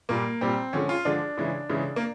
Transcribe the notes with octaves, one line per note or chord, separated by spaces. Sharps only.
A#2 G3 A#3
A#2 G3 C4
D3 F3 G#3 C#4
F4
D3 F3 G#3 D4
C#3 E3 G#3
C#3 E3 G#3
A#3